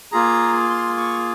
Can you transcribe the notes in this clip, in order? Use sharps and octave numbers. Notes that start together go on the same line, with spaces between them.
A#3 F4 G#4 A#5
C6
C#6